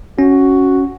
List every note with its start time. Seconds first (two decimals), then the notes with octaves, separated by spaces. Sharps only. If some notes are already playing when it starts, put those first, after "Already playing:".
0.19 C#4 F#4